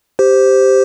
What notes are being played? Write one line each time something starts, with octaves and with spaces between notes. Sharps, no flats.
G4 C5